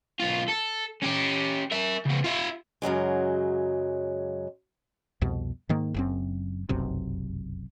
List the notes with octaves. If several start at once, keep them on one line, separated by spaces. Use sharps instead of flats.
B1 F4
A4
C#4 G4
A#4 E5
C#3 B3
F4 E5
F#2 C#3 F#3 G#3
C2 F2 B2
G#2 D#3 A#3
F#1 F#2 C4
F1 B1 F#2 C3